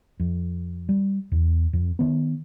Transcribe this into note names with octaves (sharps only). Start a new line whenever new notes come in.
F2
G3
E2
F2
D#3 B3